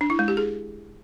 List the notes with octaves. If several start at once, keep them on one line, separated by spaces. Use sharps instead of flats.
D4
E4
G#3
G4
G#4